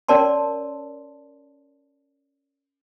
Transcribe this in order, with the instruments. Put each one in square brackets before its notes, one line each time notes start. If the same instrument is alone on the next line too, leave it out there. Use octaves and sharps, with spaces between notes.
[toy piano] C#4 A#4 C#5 D5 A5 C6